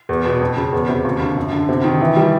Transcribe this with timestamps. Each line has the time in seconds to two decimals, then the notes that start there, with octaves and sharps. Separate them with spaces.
0.09 E2
0.25 B2
0.41 F2
0.56 C#3
0.73 E2
0.89 C3
1.05 D#2
1.21 D3
1.36 F#2
1.53 D3
1.69 C3
1.84 D#3
2.01 E3
2.17 G3